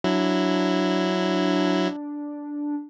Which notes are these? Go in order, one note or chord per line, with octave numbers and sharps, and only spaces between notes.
F#3 D4 E4